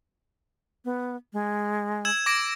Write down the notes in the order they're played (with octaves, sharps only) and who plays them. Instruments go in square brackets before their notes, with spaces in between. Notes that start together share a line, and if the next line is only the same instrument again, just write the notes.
[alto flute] B3
G#3
[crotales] E6 G#6 E7
D6 A#6 D7